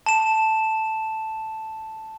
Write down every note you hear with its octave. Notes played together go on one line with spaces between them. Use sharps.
A5 E7